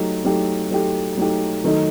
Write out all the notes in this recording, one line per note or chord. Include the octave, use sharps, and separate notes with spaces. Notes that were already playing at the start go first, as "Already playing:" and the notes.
Already playing: F#3 A3 D#4 G4
F#3 A3 D#4 G4
F#3 A3 D#4 G4
F#3 A3 D#4 G4
D#3 F#3 A3 D#4